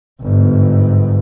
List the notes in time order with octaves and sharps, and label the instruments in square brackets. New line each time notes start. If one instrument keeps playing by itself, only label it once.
[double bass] G1 G#2